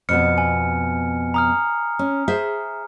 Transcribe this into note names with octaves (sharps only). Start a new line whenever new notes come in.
F2 B2 B3 F6 C#7
G#5
A#5 D#6 F6
C#4
G#4 C5 E5